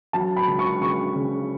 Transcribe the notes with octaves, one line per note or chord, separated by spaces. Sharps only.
F#3 A5
B5
C#2
C#6
C#3 C#6
C#3